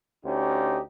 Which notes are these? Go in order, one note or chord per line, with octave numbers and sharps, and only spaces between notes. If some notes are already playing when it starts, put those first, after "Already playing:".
D2 C#4 D#4 G4